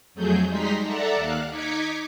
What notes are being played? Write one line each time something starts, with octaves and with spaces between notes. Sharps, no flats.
F2 F#3 A3 G#4 G6
G3 G#3 D#4 A#5 C6 B6
A4 D5 E5 F#5 A5 A#5
D#2 F5 F#6
D#4 D6 G#6 B6 C#7